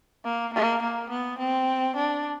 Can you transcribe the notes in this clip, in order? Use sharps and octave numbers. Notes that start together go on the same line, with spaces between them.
A#3
A#3
A#3
B3
C4
D4